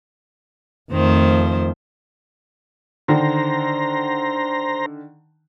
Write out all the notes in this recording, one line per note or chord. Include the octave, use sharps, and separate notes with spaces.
F2 D#3 F3 A3 C5
D3 D#3 C5 A#5